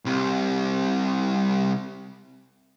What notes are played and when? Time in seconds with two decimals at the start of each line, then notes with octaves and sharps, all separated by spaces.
0.05 C2 C3